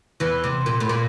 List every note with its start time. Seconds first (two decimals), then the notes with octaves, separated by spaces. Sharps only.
0.20 E2 E3
0.44 C3
0.66 A#2
0.80 A2
0.89 A#2